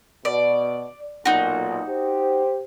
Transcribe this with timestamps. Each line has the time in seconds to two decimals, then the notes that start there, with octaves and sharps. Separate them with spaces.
0.25 B2 D5
1.25 B1 A#2 D#4 F#4
1.89 G4 C5